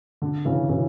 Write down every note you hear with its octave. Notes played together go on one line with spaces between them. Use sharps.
D3
C#3 E3
C#3 E3